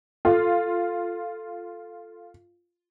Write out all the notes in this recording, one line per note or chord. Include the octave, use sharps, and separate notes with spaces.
F4 A4